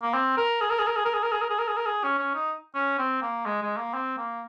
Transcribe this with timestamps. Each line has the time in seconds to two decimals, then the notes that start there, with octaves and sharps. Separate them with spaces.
0.03 A#3
0.14 C4
0.37 A#4
0.61 G#4
0.70 A#4
0.79 G#4
0.87 A#4
0.96 G#4
1.05 A#4
1.14 G#4
1.23 A#4
1.32 G#4
1.42 A#4
1.50 G#4
1.59 A#4
1.68 G#4
1.77 A#4
1.86 G#4
2.04 C#4
2.19 C#4
2.35 D#4
2.75 C#4
2.99 C4
3.22 A#3
3.46 G#3
3.62 G#3
3.77 A#3
3.94 C4
4.17 A#3